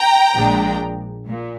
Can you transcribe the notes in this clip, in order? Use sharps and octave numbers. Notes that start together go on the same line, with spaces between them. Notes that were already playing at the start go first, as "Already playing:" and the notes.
Already playing: G5 A#5
A#1 A#2 G#3 D4
A#2